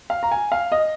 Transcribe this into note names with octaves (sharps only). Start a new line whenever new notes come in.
F5
A#5
G#5
F5
D#5